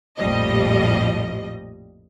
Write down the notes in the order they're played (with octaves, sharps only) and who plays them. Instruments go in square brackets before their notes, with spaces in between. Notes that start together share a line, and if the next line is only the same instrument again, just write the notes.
[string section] A#1 F2 A2 F3 G3 D#5